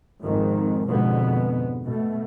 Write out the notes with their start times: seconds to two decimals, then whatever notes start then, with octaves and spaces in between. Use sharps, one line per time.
0.22 G#1 F2 G#2 D#3
0.88 F2 G#2 B2 D3 G#3 B3
1.85 B2 A3